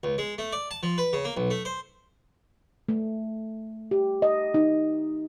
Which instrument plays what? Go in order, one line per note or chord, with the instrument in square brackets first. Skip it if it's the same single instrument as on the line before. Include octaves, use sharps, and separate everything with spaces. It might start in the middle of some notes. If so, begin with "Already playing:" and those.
[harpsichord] C#2
G#3
A3
D5
A5
F3
B4
C#3
A#3
B1
A3
C5
[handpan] A3
G4
D#5
D#4